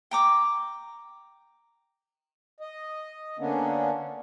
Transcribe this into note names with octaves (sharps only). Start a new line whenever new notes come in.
G5 A#5 D6
D#5
D3 A#3 B3 C#4 D4